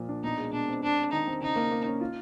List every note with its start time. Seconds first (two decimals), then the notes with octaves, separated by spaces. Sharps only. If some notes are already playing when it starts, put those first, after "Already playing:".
Already playing: A#2 F3
0.09 D4
0.24 B2 D#4
0.38 G#3
0.52 B2 D4
0.68 C4
0.83 G#3 D4
0.98 C4
1.12 D#3 D#4
1.27 C4
1.41 C#3 D#4
1.56 A#3
1.71 A#3
1.86 C#4
2.01 F4